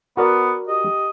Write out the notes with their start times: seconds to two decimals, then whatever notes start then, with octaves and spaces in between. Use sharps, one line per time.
0.17 B3 F#4 A#4 D5
0.68 G4 D#5